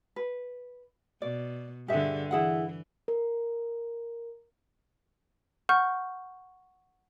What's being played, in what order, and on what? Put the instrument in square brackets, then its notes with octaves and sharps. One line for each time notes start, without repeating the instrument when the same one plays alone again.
[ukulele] B4
[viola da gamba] B2 [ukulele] D5
[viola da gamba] G2 D3 [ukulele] G4 G#4 E5
[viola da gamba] E3 [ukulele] E4 G#4 F#5
[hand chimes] A#4
[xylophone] F#5 C#6 F6 G6